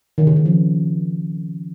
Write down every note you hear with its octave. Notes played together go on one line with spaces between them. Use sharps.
D#3
C#3
D#3
F3